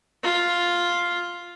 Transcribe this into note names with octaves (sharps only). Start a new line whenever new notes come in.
F4